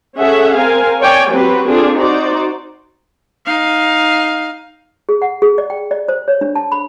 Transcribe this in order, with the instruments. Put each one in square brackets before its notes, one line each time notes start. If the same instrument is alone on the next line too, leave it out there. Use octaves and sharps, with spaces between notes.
[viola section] C#4 G#4 A4 E5 F#5
C4 A#4 F5 G#5
C#5 D5 G5 G#5
F#3 C4 F#4 G4 B4
C4 D4 F4 G#4 A4
D#4 F#4 C5 D5
[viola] D#4 F5
[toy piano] G#4
F#5
G#4
D5
G5
D5
C5
C#5
D4
A5
B5